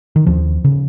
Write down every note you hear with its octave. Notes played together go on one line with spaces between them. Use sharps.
D#3
D#2 F3
C#3